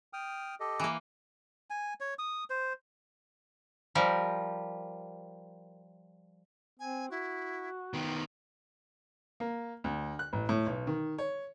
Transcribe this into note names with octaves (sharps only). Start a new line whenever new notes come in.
G5 D#6 F6
G4 A4 D#5
E3 A#3
G#5
C#5
D#6
C5
F3 G3 A#4
C4 G#5
E4 F#4
D#3 B3 G5
A#3
D2
F#6
A1
A2
B1
D#3
C#5